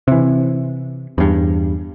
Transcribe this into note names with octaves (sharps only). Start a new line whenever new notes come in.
C3 E3
E2 G2